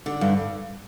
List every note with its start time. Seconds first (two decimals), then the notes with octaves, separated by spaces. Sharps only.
0.06 D3
0.21 G2